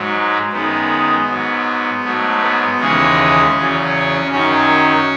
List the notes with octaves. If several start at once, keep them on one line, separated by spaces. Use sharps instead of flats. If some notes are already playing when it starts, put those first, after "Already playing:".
Already playing: G#2 F#3
F#2 D#3 G#3 B3
G#2 F#3
G#2 F#3 A3
B3
D#2 C#3 E3 G#3 C#4
E2 C#3 F#3
F#2 D#3 F#3 C#4